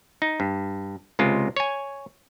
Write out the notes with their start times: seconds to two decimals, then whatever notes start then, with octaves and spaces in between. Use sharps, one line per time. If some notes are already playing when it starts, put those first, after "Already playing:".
0.22 D#4
0.40 G2
1.19 C#2 C3 G#3 F4
1.57 C#5 G#5